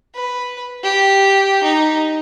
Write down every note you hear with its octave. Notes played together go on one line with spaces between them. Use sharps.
B4
G4
D#4